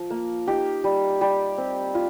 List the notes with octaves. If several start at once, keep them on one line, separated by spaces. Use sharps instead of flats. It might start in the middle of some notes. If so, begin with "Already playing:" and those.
Already playing: F3
A#3
D#4 G4
G3
G3 G4
C4
F4